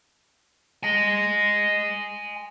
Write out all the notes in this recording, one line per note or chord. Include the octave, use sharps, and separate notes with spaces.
D#5 G#5